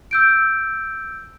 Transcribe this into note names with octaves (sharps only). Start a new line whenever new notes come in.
E6 G6 D7